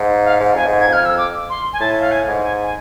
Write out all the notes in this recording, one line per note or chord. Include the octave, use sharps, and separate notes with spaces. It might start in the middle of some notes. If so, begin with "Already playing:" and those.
Already playing: G#2
F5
G#2
F2 G#5
G#2
G#6
F2
F6
E6
D6
C6
G#5
A2 A5
F5
G#5
G#2
G#5
G#5